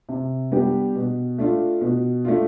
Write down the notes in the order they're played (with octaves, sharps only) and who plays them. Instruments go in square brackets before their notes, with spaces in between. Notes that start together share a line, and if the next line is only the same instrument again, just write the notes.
[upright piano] C3
G3 B3 D4 G4
B2
A3 D4 F4
B2
A3 D4 F4